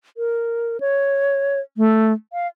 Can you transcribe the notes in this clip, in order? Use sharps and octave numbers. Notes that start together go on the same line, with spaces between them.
A#4
C#5
A3
F5